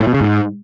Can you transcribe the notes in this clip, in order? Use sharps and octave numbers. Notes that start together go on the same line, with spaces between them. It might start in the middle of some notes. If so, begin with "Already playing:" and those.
A2
B2
C#3
G#2